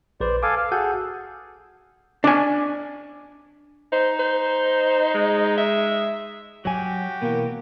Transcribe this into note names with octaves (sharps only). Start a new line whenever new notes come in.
A#1 B4 C5 D5
A4 F5 G#5 D6
F5
F#4 G#4 A4 F#5 G6
D4 G#5
D#4 C5
C5
G#3
E5
F#3 F#4 G4 C#5 G#5
B2 E3 A#3